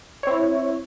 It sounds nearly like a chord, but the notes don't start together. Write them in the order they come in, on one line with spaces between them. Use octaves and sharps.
C#5 C4 E4